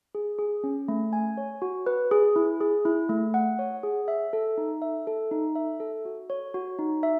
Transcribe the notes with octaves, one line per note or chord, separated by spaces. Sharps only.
G#4
G#4
C#4
A3
G#5
C#5
F#4
B4
G#4
E4
G#4
E4
A3
F#5
C#5
G#4
E5
A4
D#4
E5
A4
D#4
E5
A4
F#4
C#5
F#4
D#4
E5